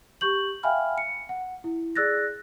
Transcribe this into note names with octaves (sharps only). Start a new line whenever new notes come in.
G4 C#6 G6 F#7
E5 F5 G5 G#5 B5 F6
C#7
F#5
E4
G#4 D5 E6 F#6 A6 A#6